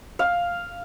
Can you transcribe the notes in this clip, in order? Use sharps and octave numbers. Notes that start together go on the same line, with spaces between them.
F5